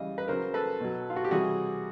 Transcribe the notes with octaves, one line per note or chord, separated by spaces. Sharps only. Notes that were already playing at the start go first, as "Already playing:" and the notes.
Already playing: C#3 E3 G3 D#5 F5
B4
C#3 F#3 A#4 C5
A4 B4
B2 F#3
F4
F#4
G4
C3 E3 G3 F#4 G#4